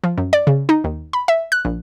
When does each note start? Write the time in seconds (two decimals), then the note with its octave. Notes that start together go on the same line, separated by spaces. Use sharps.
0.04 F3
0.18 F#2
0.33 D5
0.47 C#3
0.69 D#4
0.84 D#2
1.13 B5
1.28 E5
1.52 F#6
1.65 A#1